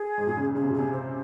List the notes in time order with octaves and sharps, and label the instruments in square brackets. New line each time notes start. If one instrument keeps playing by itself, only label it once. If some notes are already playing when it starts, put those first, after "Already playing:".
Already playing: [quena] G#4
[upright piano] G#2
A#2
C#3
[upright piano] C#3 [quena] G#4
[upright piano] C3
A#2
[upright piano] C3 [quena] G#4
[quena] C5